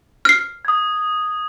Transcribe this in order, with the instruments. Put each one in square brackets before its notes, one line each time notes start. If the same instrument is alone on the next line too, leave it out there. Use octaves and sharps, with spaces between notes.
[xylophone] F6 C7
[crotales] D#6 G#6